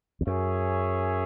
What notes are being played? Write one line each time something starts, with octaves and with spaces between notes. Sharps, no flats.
E2
F#2 C#4 G#4 C#5 E5